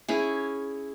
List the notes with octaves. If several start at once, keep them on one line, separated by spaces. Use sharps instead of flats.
C#4 E4 G#4